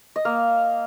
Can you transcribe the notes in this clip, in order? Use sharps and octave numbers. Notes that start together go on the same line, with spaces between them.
D#5
A#3 F5